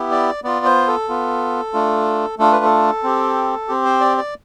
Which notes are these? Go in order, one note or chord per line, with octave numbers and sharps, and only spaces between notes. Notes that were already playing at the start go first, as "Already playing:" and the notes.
Already playing: B3 E4 G4
D5
B3 F4 D5
C5
A4
B3 F4
A3 D4 F4
A3 D4 F4 A4
B4
A4
C4 G4
C4 G4
C5
D5
D5